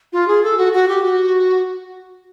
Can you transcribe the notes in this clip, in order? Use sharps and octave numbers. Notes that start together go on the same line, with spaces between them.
F4
G#4
A4
F#4
F#4
G4
F#4